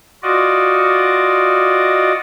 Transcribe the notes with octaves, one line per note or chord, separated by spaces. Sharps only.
F4 F#4 D5 D#5